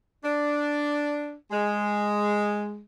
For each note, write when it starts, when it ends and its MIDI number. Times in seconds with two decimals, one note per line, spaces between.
0.24 1.34 62
1.51 2.81 56